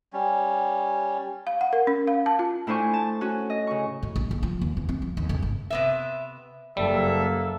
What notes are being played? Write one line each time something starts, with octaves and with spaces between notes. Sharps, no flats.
G3 C#4
F5
F#5
A#4
C#4
F5
A5
F4
A2 D4 E4 C5 G#5 C#6
A5
C#4 F#4
D#5
C#3 C#6
A2
A#1
A#1
F3
D#2
E2
C4
F3
D#2
F1
G#1
C3 B3 E5
F#1 G3 A#3 A4 E5